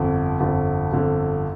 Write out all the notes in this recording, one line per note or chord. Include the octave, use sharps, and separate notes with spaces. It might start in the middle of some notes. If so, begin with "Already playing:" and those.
Already playing: G1 F2 D3
G1 F2 D3
G1 F2 D3